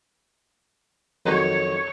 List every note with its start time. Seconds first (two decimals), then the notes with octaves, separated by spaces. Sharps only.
1.26 F2 D#3 F#3 C#5